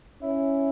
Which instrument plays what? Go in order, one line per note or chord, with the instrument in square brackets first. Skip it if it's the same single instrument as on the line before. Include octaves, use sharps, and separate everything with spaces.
[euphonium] C#4 [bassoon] E4